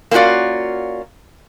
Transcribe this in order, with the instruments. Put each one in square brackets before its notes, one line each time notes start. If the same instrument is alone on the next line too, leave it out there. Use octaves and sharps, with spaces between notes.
[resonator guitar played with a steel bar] A#3 C4 C#4 F4 F#4 D5